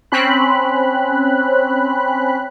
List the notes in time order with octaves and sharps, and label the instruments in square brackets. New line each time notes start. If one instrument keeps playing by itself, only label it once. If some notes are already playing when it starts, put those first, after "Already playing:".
[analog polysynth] C4 C#4 B5 F#6